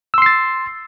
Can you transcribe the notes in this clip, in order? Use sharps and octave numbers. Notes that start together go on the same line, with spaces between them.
C6 E6 A6 C7